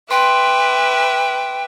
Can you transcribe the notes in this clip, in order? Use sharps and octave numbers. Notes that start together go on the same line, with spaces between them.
B4 E5 G5 C6 D6